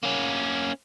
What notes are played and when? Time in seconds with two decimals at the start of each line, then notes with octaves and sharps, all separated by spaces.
0.03 A#3 C#4